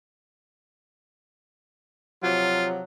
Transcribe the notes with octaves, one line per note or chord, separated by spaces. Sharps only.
C3 F3 F#3 F4